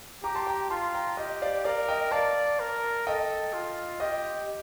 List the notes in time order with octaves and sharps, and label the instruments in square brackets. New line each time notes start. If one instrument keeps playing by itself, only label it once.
[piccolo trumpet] G4 [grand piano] A#5 D6
[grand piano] A5 C6
G5 A#5
[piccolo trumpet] F4 [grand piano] A5 C6
[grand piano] G5 A#5
[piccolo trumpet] G4 [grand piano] D#5
[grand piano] D5 F5
[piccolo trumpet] A#4 [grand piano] D5 F5
[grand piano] D#5 G5
[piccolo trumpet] D5 [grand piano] F5 A5
[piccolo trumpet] A#4
[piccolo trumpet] A4 [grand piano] D#5 G5
[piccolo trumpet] F4
[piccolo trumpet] G4 [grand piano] D#5